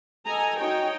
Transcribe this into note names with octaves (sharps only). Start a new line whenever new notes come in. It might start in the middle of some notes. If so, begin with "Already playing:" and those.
A4 D#5 G#5 A#5
D#4 F#4 C#5 D#5 G5